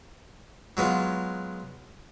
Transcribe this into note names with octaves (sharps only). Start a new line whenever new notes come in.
F#3 G#3 B3 F4